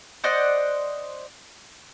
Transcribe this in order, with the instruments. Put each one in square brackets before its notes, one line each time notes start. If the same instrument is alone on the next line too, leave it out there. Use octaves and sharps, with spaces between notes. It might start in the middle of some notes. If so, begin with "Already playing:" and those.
[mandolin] C5 D5 D#5 F#5